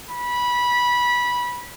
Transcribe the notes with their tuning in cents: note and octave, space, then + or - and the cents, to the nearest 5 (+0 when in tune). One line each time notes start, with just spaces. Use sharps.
B5 -20